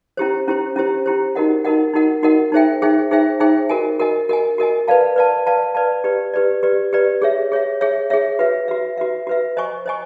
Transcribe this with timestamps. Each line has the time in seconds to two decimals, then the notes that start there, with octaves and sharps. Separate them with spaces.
0.17 C#4 E4 G4 C5
0.48 C#4 E4 G4 C5
0.76 C#4 E4 G4 C5
1.06 C#4 E4 G4 C5
1.35 D#4 F#4 A#4 D#5 F#5
1.65 D#4 F#4 A#4 D#5 F#5
1.94 D#4 F#4 A#4 D#5 F#5
2.23 D#4 F#4 A#4 D#5 F#5
2.52 D#4 G#4 C5 E5 G5
2.82 D#4 G#4 C5 E5 G5
3.11 D#4 G#4 C5 E5 G5
3.40 D#4 G#4 C5 E5 G5
3.69 F#4 A#4 D#5 G#5
3.99 F#4 A#4 D#5 G#5
4.29 F#4 A#4 D#5 G#5
4.58 F#4 A#4 D#5 G#5
4.88 B4 D5 F5 A5
5.16 B4 D5 F5 A5
5.46 B4 D5 F5 A5
5.75 B4 D5 F5 A5
6.04 G4 B4 D5
6.33 G4 B4 D5
6.63 G4 B4 D5
6.93 G4 B4 D5
7.22 G#4 C#5 E5
7.52 G#4 C#5 E5
7.81 G#4 C#5 E5
8.10 G#4 C#5 E5
8.39 F#4 B4 E5
8.68 F#4 B4 E5
8.98 F#4 B4 E5
9.27 F#4 B4 E5
9.57 C5 D#5 G#5 C#6
9.86 C5 D#5 G#5 C#6